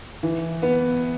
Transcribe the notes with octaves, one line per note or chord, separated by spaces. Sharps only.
E3
B3